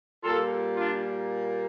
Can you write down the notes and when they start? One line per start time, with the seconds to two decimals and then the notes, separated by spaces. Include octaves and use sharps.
0.23 A#2 G3 A#3 F4 A4
0.76 D4 F4